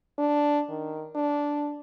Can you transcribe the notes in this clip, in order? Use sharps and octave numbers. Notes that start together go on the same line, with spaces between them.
D4
D#3
D4